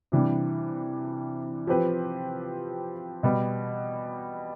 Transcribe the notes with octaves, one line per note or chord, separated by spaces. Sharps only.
C3 E3 G3 D4
F3 C4 G4 B4
B2 G3 B3